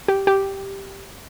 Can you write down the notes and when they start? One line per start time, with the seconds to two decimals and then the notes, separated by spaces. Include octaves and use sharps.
0.08 G4
0.27 G4